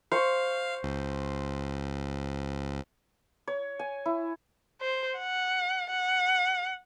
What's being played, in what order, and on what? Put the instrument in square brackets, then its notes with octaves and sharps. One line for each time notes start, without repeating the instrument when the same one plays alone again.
[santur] C5 C#6 [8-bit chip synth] F5
[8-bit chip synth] C#2
[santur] C#5
G#5
E4
[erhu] C5
F#5
F#5